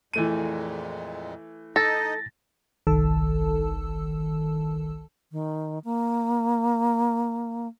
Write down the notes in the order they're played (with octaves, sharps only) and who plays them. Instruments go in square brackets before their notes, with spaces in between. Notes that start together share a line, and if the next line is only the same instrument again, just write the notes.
[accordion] F2 A#2 G#3 [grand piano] E3 A3 D#7
[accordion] D#4 D#5 [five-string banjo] A4 [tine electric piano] A6 A#6
[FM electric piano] G1 C2 D#3 A4 A5 E6
[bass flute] D#3
A#3